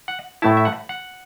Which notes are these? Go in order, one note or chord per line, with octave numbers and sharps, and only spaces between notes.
F#5
A2 A3 E4 A5
E5
F#5
F#5